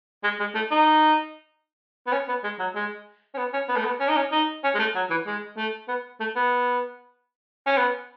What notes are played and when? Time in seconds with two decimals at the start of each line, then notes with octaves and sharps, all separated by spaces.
0.24 G#3
0.40 G#3
0.55 A3
0.71 D#4
2.07 B3
2.12 C#4
2.28 B3
2.44 G#3
2.59 F#3
2.75 G#3
3.34 C#4
3.38 B3
3.53 C#4
3.68 B3
3.76 A3
3.84 B3
4.00 C#4
4.08 D#4
4.16 C#4
4.32 D#4
4.64 C#4
4.75 G#3
4.79 A3
4.95 F#3
5.10 E3
5.26 G#3
5.57 A3
5.88 B3
6.20 A3
6.36 B3
7.66 C#4
7.77 B3